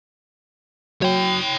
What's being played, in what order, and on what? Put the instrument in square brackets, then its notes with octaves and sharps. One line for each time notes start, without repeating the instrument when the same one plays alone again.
[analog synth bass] F#3 [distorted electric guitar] C#5 G5